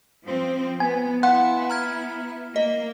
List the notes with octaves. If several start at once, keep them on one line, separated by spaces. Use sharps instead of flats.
F3 C4
B3 G#5
B3 E4 F5 F#5 G#5 C6
A#5 F6 G#6
A#3 D#5